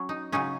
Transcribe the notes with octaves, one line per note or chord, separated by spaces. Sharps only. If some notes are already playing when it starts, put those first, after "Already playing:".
Already playing: F#3 C#4
D#4
C#3 F#3 C#4 D#4